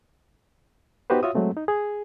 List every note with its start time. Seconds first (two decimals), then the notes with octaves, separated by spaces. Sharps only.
1.10 B3 D#4 F#4 G4 B4 C5
1.23 F4 F#4 C#5 E5 D#6
1.35 F#3 G#3 A3 C4
1.56 D#4
1.68 G#4